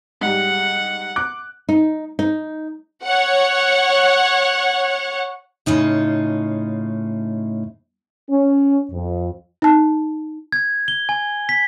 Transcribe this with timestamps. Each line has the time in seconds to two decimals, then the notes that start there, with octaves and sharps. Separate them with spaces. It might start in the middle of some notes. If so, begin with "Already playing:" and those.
0.21 G#2 G3 F#5
1.16 D6 F#6
1.69 D#4
2.19 D#4
3.05 C#5 F#5
5.66 A2 C#3 D#4 F4
8.30 C#4
8.92 F2
9.62 D#4 A5
10.52 G#6
10.88 G7
11.09 G#5
11.49 B6